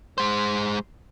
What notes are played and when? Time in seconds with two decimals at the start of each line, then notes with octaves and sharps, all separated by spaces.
0.18 G#3 C5